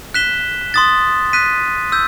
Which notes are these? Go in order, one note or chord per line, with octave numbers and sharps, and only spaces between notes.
F#6 B6 E7 G7
C6 D#6 A6
F#6 B6 D#7
E6 G6